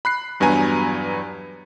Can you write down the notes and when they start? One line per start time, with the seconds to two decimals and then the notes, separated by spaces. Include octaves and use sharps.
0.05 B5 F#6 C7
0.40 E2 G2 F#3 B3 G#5 A#5